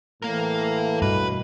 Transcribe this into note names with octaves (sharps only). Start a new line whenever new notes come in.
A2 E3 A#3 A#4
G2 B2 B4